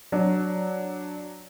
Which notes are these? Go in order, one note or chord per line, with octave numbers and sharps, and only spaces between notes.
F#3 D4